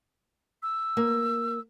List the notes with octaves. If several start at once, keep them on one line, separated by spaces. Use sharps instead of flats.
E6
A#3